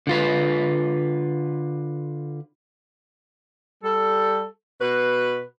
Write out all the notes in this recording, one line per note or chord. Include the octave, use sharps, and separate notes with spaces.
D3 F4 B4
G3 A4
B2 F#4 B4